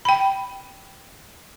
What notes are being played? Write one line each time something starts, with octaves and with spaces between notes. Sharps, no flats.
G5 B5